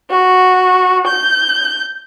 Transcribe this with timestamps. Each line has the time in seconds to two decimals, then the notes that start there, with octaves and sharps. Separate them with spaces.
0.11 F#4
1.08 G6